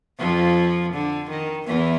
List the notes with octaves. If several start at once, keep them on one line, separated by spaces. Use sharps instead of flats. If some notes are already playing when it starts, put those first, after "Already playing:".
F2 F3
D3
D#3
E2 E3